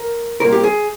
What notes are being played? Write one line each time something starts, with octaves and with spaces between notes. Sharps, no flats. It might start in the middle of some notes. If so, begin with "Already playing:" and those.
Already playing: A#4
C2 A#2 A#4
G4
G#4